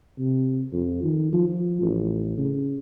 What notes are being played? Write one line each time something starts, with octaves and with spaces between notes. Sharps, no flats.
C3
F2
D#3
F3
A1
C#3